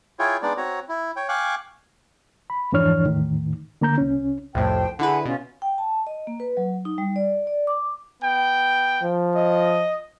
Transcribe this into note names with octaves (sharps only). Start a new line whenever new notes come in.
E4 F4 G#4 C#5 G5
G#3 B3 D4 D#4 D5
C4 F#4 C#5 A#5
E4
C#5 G5
F5 G5 G#5 C#6 D6 F#6
B5
F2 G#2 E3 D4 C#5 F6
E2 A2 D#3
D3 A#3 A#5 G6
C2 C#4
C2 F2 A2 C5 G5 A5
D3 E4 G#4 B4 F#5
B2 C#4 F4
G5
A5
D#5
A#3
B4
F#3
D#4
G3
D5
D5
D6
B3 G5
F3
D#5